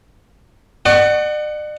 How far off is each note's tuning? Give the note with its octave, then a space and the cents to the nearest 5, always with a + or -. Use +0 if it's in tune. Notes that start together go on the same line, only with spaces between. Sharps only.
D5 +45 F#5 +15 C#6 +0